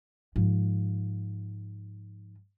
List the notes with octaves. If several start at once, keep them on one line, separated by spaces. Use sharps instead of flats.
G#2 F3